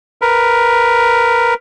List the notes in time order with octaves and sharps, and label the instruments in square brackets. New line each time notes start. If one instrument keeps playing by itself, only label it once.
[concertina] A#4 B4